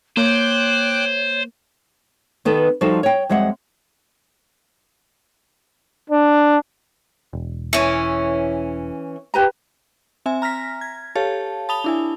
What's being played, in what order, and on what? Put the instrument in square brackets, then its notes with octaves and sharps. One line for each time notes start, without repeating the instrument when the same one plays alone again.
[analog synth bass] A#3 [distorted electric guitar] C5 [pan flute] C#5 [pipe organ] G5 D6 F#6
[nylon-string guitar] D#3 B3 D#4 A4
F3 G3 D#4 F#4 A4 C5
C#5 G5
F2 G3 G#3 E5 F#5
[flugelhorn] D4
[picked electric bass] E1
[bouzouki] E3 C#4
[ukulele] G4 B4 A#5
[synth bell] C4 E5 G#5
A#5 F6 A#6 B6
G#6
G4 A4 C#5 F5 A5
A5 B5 D#6 F7 G7
D4 E4 G#5